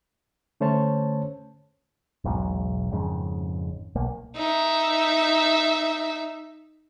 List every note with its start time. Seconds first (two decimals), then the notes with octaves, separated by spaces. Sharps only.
0.60 D3 A3 C#4 C5 C#5 A5
2.24 E1 B1 G#2 F#3
2.92 G#1 F2 G#2 C#3
3.95 B1 A#3
4.36 D#4 E5